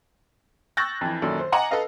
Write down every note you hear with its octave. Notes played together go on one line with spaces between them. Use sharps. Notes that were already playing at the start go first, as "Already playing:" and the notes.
C#6 E6 F#6 G6 A6 A#6
F2 E3
F#2 A#2 D#3 A4 D5
C5
D#5 F#5 G#5 A#5 D6
A4 B4 D#5 F5